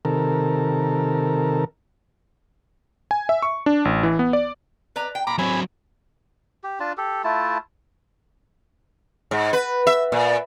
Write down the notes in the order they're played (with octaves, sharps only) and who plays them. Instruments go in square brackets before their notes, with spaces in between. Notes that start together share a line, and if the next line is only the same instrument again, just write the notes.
[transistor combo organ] C3 D#3 A4 A#4
[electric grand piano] G#5
E5
C#6
D4
A1
E3
B3
D5
[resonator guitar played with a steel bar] B4 D5 A#5
G5
[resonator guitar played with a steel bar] A#2 F4 [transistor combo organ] A#5 B5 D6
[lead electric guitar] F#3 C4 [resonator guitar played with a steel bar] C#5 D5 [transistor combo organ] G#5 B5
[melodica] G4
D4 F4 A5
G4 A4
A3 E4 F4 A5
[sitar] G#2
B4
E5
A#2